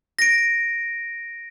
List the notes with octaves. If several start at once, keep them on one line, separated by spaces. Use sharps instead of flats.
A#6 D7